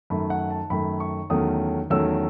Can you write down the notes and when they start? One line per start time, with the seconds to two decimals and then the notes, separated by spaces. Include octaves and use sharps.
0.10 F#2 D#3 A3 B5
0.30 F#5
0.51 A5
0.70 F#2 D#3 A3 B5
1.00 C#6
1.30 E2 D#3 F#3 A3 C#4 D#6
1.90 E2 D#3 F#3 A3 C#4 E6